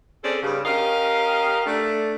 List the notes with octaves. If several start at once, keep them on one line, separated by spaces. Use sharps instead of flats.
C4 C#4 G#4 A4 C5 D5
G2 C#3
C#4 G4 A#4 D#5 F5
A3 D4